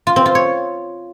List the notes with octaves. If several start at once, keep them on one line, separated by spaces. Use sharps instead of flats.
F4
C4
F4
C#5